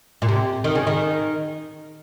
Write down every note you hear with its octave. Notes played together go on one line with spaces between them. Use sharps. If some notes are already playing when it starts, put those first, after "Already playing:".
A#2
C3
D#3
C#3
D#3